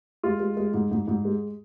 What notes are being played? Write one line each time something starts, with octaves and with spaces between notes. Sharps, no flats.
G#3 F4
G#3
G#3
G#2
G#2
G#2
G#3